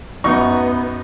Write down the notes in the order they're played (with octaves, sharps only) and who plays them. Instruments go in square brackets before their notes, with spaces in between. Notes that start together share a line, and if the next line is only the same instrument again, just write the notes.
[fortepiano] F#2 D#4 C#6 [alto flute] B3